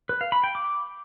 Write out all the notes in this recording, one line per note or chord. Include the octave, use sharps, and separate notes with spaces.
B4
F5
B5
G5
D6